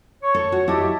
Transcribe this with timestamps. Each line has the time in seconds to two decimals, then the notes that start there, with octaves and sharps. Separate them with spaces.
0.23 C#5 C#6
0.34 A4
0.52 F#4
0.68 E4 G4 D#5 E5 A5